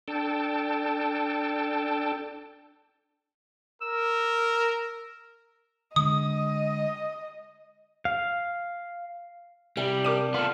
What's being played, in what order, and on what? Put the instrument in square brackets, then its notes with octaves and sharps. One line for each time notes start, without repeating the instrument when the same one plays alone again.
[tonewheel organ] D4 A4 G5 A5
[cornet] A#4 [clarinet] E6
[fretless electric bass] D3 G#3 [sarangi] D#5 [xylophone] D#6
[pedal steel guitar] F5
[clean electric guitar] C3 [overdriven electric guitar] G3 [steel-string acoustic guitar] E4
[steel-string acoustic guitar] D4 [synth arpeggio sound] A#4 D6 D#7
[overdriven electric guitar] B3 A4 [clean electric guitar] F4